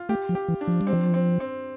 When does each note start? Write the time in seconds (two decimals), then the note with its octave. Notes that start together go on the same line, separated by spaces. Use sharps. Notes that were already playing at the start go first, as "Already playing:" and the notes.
Already playing: F4
0.09 A3 G4
0.29 F3
0.35 G4
0.48 E3
0.61 D4
0.68 F3
0.81 G3
0.87 C4
0.93 F3
1.14 C4
1.40 C4